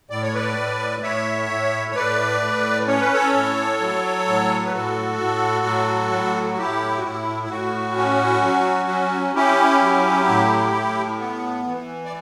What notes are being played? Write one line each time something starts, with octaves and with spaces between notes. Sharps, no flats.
A2 D5
C#5
B4 D5
A2
A2 C#5 E5
A2
C#5
A2 B4 D5
A2
C#4 C#5
B4
A4 C#5
A2
F#3
A2
B4
A2 F#4 A4
A2
F#3
A2
F#4
A2 E4 G4
F#4
A2 E4
E4
A2 F#4
C#4
F#3
C#4
C#4 E4 G4
F#3
A2
A2
B3
E3
D5